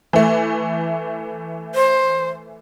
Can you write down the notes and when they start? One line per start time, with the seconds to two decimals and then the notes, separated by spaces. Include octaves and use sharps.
0.13 E3 A3
1.75 C5